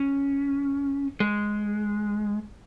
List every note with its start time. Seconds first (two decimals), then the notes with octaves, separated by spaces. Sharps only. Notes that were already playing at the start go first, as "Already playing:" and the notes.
Already playing: C#4
1.20 G#3